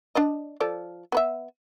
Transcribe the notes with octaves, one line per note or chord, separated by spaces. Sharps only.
D4 D5 D#5
F3 A4 D5
B3 B4 E5